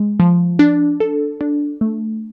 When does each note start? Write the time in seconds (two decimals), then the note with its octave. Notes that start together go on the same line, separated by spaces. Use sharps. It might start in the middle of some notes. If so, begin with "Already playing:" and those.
Already playing: G#3
0.20 F3
0.59 D4
1.00 A4
1.41 D4
1.81 A3